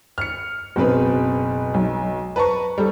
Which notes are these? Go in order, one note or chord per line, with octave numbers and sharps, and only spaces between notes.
F6 C#7
F#1 B2 C4 B4
B1
B4 A5 A#5 C#6
G3 A4